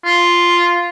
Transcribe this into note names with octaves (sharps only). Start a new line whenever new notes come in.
F4